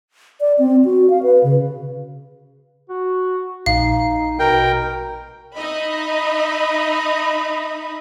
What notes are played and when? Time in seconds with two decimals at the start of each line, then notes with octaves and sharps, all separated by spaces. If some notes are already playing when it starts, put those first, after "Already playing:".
0.40 D5
0.59 C4
0.85 F#4
1.10 F5
1.23 B4
1.43 C#3
2.89 F#4
3.66 A#1 D#4 F5
4.39 B2 A#4 G5
5.54 D#4 D#5 E5 B5